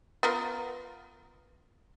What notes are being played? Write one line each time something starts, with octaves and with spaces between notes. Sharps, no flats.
B3 F4 A#4